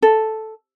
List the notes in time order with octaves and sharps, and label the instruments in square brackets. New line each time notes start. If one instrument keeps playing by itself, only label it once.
[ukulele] A4